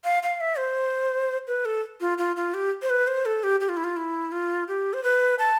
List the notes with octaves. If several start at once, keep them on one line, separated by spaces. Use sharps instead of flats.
F5
F5
E5
C5
B4
A4
F4
F4
F4
G4
C5
B4
C5
A4
G4
G4
F4
E4
F4
E4
F4
G4
C5
B4
A5